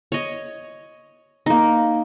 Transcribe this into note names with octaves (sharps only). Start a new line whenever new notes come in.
C#5 D#5
A#3 D#4